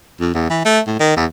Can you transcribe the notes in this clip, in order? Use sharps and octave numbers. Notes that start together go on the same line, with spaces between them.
F2
E2
E3
A3
A2
D#3
E2